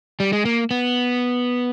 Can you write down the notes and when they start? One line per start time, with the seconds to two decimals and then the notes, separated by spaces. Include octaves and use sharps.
0.20 G3
0.33 G#3
0.45 A#3
0.71 B3